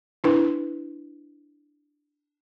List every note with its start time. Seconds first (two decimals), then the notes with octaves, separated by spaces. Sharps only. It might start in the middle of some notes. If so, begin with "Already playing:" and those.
0.24 D4 E4 B4